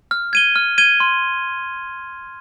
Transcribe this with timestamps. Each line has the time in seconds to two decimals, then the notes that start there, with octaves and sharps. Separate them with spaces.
0.11 F6
0.33 G#6 D#7 G7
0.56 F6
0.78 G#6 D#7 G7
1.00 C6